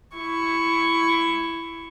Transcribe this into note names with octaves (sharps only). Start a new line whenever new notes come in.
E4 C#6